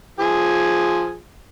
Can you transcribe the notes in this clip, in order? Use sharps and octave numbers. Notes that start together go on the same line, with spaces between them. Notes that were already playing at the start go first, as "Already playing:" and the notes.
F3 G#4